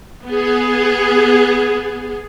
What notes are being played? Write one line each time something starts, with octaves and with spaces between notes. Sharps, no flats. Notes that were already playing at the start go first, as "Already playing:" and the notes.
B3 G#4